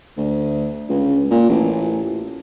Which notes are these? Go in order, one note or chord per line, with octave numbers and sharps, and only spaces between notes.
D2
C#2
A#2
A1